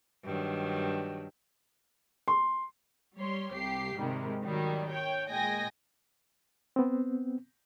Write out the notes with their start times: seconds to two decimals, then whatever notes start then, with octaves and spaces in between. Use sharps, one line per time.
0.24 G2 D#3 F#3
2.28 C6
3.18 G3 C#5 C6
3.53 C2 G4 C7
3.98 G#2 C3 D#3 G3 G#3
4.43 D#3 F#3 G3
4.91 C#5 G5
5.31 A#2 G#3 D#5 G5 G#5 A#6
6.76 B3 C4